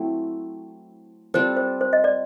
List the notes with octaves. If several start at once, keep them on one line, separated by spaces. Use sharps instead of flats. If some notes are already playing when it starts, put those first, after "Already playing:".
Already playing: F#3 A3 C4 E4
G3 C4 F4 A4 C5
C5
C5
D#5
D5